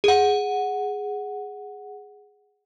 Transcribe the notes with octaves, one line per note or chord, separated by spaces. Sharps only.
G#4 F#5